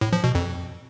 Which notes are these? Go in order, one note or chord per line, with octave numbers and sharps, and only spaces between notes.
A2
F3
B2
F2